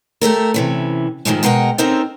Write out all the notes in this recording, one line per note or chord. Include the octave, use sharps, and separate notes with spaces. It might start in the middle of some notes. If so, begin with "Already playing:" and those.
A3 G4 A4 A#4
C3 E3 C#4
G#2 D#3 F3 G#3 A3
B2 G#3 A#4 F#5 G5
C4 C#4 D#4 A4 A#4 C5